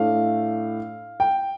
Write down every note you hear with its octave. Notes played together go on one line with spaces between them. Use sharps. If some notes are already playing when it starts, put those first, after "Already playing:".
Already playing: A2 A3 D4 F5
G5